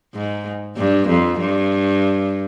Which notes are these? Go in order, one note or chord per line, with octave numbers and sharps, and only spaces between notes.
G#2
G2
F2
G2